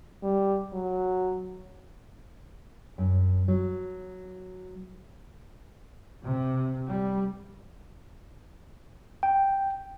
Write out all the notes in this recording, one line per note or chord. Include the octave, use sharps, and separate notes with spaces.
G3
F#3
F#2
F#3
C3
G3
G5